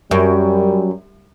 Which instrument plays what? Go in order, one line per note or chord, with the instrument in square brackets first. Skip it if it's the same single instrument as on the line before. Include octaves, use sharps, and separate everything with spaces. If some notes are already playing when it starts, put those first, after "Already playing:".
[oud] F#2 [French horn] G3